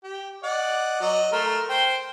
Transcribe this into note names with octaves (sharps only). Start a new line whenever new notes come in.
G4
D5 D#5 F#5
F#3 D#5
A3 A#4 C6
C5 G5 C6